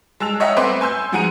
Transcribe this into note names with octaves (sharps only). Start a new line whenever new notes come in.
G#3 A5 E6 F7
C#5 D#5 E5 F#5 G5 A#5
A3 C4 B4 C6 D6
G#5 C6 E6 G6
G#2 F3 G#4 F#5 A#5 D#7